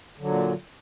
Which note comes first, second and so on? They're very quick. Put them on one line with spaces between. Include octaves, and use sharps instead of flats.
D3 F#3 A#2